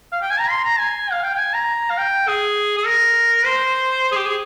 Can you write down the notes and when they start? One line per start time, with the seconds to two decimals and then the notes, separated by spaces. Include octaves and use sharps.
0.12 F5
0.21 G5
0.30 G#5
0.39 A#5
0.50 C6
0.64 A#5
0.78 G#5
1.12 F5
1.23 G5
1.34 G5
1.38 G#5
1.54 A#5
1.90 F5
1.97 G5
2.28 G#4
2.77 G#4
2.86 A#4
3.45 C5
4.11 G#4
4.15 G4
4.25 G#4